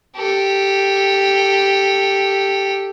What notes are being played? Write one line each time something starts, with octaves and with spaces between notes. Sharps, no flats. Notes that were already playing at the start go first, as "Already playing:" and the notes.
G4 A4